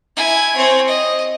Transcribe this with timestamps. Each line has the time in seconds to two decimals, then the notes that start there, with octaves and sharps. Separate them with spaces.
0.16 E4 G#5
0.56 C4 C#5
0.87 D#5